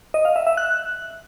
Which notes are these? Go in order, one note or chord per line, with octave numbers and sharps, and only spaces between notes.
D#5
F5
E5
E5
F#6